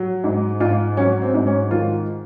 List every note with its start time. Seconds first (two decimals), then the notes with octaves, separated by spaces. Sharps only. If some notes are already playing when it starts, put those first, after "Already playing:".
Already playing: F#3
0.24 G#2
0.60 G#2 F4
0.97 F#3 C#4
1.22 C4
1.34 G#2
1.47 C#4
1.71 D#3 F4